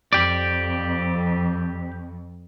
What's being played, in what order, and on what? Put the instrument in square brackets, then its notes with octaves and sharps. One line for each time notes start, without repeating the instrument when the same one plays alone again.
[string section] F2 [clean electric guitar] G4 D5